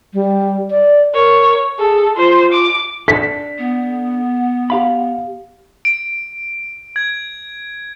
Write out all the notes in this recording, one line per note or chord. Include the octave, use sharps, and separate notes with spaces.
G3
D5
A#4 C#5
G#4 A4
F4 C5
D6
D4 A4 B6
B3
G4 F5 B5
D7
G#6